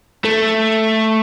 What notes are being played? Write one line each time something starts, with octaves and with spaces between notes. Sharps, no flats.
A3